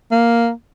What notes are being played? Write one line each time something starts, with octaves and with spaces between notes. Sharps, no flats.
A#3